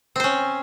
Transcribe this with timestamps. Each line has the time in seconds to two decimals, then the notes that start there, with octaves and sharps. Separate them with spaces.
0.16 C4
0.20 C5
0.24 C#4